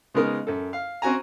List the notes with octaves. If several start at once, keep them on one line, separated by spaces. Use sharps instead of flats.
C#3 G#3 B3 D#4 A#4
F#2 A4
F5
C4 C#4 F#4 G#5 A#5